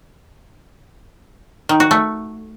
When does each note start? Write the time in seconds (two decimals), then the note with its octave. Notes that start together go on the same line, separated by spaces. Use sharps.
1.69 D#3
1.80 F#4
1.91 A3